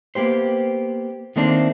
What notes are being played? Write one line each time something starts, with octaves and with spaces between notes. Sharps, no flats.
A#3 B3 G4 C5
D#3 A3 A#3 C4 D4